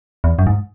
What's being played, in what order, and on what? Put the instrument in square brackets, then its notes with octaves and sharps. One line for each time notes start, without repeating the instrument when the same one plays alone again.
[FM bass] E2
F#2
G#2